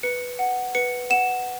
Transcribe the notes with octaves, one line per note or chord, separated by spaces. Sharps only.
B4 C#7
F#5
B4 C#7
F#5 E7